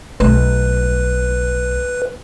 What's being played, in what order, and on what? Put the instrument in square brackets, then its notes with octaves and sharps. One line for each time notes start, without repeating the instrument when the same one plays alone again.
[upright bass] B1 A3 [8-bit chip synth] B4